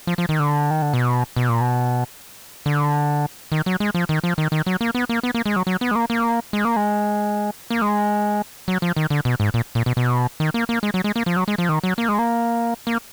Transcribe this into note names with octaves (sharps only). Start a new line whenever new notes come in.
F3
F3
D#3
D3
D#3
D3
B2
B2
A#2
B2
D3
D#3
F#3
G#3
F3
D#3
F3
D#3
D#3
F#3
A#3
B3
A#3
B3
A#3
G#3
F#3
F#3
B3
G#3
A#3
A#3
G#3
A#3
G#3
A#3
G#3
F#3
F3
D#3
D3
B2
G#2
A#2
A#2
B2
B2
D#3
A#3
A#3
G#3
F#3
G#3
A#3
F3
F#3
G#3
F3
D#3
F#3
A#3
G#3
A#3
A#3